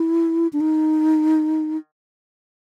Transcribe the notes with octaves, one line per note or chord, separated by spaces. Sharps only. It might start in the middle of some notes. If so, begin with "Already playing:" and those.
Already playing: E4
D4
D#4